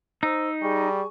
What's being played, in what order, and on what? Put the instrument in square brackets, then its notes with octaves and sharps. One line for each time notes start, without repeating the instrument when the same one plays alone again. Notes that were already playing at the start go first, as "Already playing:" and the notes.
[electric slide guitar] D#4 [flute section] C5 E6
[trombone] G3 [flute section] G#4 G#5 C#6